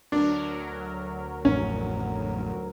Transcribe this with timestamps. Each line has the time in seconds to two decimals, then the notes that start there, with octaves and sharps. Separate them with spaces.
0.12 D2 F#3 D4 A#4
1.45 A1 F2 A2 C#4